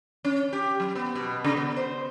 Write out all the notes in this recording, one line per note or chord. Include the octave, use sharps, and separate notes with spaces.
C#4
G4
F#3
B3
B2
C#3
B3
C5